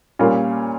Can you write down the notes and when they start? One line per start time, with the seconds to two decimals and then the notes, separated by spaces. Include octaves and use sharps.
0.19 A#2 G3 A#3 C#4 F4